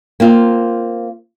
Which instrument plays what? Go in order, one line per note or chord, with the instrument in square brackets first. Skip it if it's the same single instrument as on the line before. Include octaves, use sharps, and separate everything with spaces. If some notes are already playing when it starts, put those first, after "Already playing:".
[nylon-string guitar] A#3 C4 F4